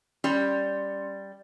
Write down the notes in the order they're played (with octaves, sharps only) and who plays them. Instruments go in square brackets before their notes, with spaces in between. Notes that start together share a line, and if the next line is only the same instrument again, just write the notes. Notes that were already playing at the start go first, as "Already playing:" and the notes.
[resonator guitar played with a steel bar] G3 [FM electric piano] C#4 C6